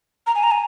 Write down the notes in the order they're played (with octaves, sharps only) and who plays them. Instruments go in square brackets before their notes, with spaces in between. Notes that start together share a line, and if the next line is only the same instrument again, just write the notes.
[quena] A#5
G#5
A#5
G#5